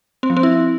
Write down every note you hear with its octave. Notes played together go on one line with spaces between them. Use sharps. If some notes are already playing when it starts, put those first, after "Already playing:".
C4
F3
C4
E4